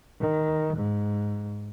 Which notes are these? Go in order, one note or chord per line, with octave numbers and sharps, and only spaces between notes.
D#3
G#2